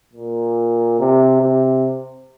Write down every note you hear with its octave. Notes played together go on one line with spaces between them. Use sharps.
A#2
C3
C3